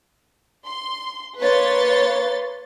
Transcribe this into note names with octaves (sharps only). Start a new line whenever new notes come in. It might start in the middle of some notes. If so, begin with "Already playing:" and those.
C6
A#3 B4 C#5 C6 A6